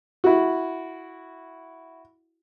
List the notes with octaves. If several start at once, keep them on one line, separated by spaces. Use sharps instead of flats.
E4 F#4